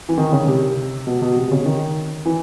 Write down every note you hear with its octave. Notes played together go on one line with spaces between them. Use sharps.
E3
D#3
C#3
C3
B2
B2
C3
C#3
D#3
E3